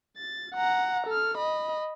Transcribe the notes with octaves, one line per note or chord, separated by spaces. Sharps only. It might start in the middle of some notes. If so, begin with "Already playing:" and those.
A6
F#5 A#5
A4 F6
D#5 B5